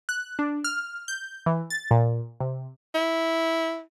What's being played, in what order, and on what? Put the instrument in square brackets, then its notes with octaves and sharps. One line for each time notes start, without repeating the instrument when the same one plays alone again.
[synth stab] F#6
D4
F6
G6
E3
A6
A#2
C3
[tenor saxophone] E4